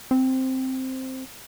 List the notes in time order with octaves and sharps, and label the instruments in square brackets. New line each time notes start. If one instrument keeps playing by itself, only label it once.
[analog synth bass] C4